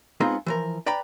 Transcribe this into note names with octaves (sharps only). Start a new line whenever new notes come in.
G#3 B3 C4 D#4 F4 G#4
E3 F3 A#4
B4 D5 G5 A#5 B5